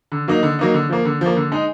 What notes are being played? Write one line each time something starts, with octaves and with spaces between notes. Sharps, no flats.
D3
F#3 A#3 D#4
D3
F#3 A#3 D#4
D3
F3 A#3
D3
F3 A#3
D3
G#3 D#4